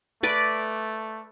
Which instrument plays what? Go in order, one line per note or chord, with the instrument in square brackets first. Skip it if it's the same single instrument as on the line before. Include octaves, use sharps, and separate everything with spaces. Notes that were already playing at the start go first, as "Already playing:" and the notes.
[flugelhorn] A3 [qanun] B4 D5 B5